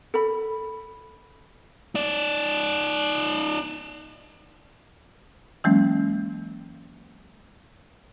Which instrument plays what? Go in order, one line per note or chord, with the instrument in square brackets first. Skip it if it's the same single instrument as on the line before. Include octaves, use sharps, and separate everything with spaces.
[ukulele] A4 B5
[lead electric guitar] D#4 D5
[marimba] E3 F#3 G#3 A#3 C#4